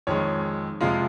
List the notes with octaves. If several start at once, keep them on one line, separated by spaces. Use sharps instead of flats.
F2 D#3 G#3 C#5
F2 C3 F3 G#3 F5